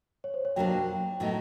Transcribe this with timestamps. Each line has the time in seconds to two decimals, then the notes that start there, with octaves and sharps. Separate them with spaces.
0.24 C#5
0.34 C5
0.45 C#5
0.56 B2 F#3 A#3 D4 G5
1.20 A2 F#3 B3 D#4